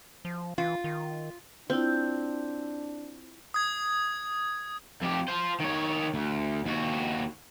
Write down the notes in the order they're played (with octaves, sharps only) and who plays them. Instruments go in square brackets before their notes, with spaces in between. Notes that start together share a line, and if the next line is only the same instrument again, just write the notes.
[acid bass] F3
[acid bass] E3 [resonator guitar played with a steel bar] F4
[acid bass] D#3
[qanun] C4 [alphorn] D4 [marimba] E4 F4
[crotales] D#6 G#6
[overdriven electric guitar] F2 G4
F4 C5
D#3 C#5
D2
D#2 F#4